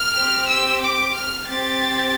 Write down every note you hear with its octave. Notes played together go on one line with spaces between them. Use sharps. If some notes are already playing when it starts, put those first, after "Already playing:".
Already playing: F6
C4 G4
E6
D6
F6
C4 G4 A6